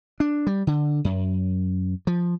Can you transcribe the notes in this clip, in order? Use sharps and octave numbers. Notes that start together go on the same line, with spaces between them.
D4
G3
D3
F#2
F3